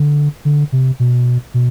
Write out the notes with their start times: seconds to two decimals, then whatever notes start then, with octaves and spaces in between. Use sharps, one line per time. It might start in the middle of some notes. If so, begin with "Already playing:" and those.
Already playing: D3
0.45 D3
0.72 C3
1.00 B2
1.54 B2